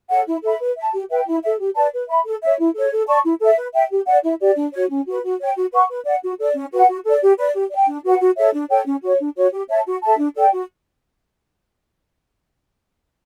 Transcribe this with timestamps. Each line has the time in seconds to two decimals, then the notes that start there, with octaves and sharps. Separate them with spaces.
0.10 A4 C#5 F#5
0.27 E4
0.44 A4 E5 B5
0.60 B4
0.76 E5 A5
0.93 G4
1.10 B4 E5 G5
1.26 E4
1.42 A4 E5
1.59 G4
1.75 B4 D5 A5
1.93 B4
2.09 E5 B5
2.26 A4
2.42 C#5 E5
2.59 E4
2.75 A4 C#5
2.92 A4
3.08 D5 A5 C#6
3.24 E4
3.41 A4 E5
3.57 B4
3.74 E5 G5
3.90 G4
4.07 D5 F#5
4.23 E4
4.41 G4 D5
4.56 D4
4.73 F#4 C#5
4.90 C#4
5.07 F#4 B4
5.23 F#4
5.40 C#5 G5
5.56 F#4
5.72 B4 F#5 C#6
5.89 B4
6.06 D5 F#5
6.23 F#4
6.39 A4 D5
6.55 C#4
6.72 F#4 B4 F#5
6.89 F#4
7.05 A4 D5
7.22 G4
7.38 B4 D5
7.54 G4
7.70 D5
7.76 G5
7.88 D4
8.05 F#4 B4 F#5
8.21 F#4
8.37 A4 C#5 E5
8.54 D4
8.70 A4 C#5 G5
8.87 C#4
9.03 F#4 C#5
9.20 D4
9.36 F#4 C#5
9.53 G4
9.69 C#5 E5 A5
9.86 F#4
10.02 A4 E5 A5
10.18 D4
10.35 A4 D5 G5
10.52 F#4